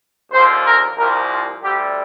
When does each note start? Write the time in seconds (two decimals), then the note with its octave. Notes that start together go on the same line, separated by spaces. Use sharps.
0.32 D#2 D3 F3 C5
0.66 A#4
0.97 C2 A#2 F3 A#4
1.31 F4
1.63 D2 D3 G3 G4